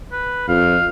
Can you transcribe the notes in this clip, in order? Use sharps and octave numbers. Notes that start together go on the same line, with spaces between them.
B4
F2 F5